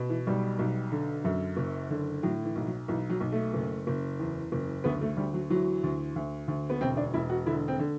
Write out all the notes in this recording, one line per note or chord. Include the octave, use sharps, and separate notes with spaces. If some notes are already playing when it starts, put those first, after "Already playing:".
Already playing: B2
E3
B1 G3
B1
D3
F#2
F#1
D3
A2 F#3
E3
B1
F#3
B1 E3
F#3
B1
A3
F#1
F#1
E2
F#1
D2 B3
A3
D2 G3
F#3
E3 F#3
D2
D2
D2
B3
E1 C4
D4
E1 E4
F#4
D3 E4
C4
D3